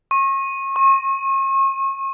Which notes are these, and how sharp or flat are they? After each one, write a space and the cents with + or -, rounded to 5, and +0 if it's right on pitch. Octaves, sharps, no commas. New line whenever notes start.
C#6 -35
C#6 -40